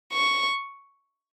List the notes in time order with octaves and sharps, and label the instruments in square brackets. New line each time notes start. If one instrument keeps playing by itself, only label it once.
[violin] C#6